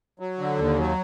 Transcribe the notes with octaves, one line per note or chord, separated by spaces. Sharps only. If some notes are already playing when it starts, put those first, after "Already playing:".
F#3
D3
D#2
F#3